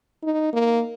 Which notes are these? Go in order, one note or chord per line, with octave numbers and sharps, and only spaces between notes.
D#4
A#3